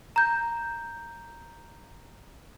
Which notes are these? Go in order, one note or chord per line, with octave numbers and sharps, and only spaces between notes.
A#5 G6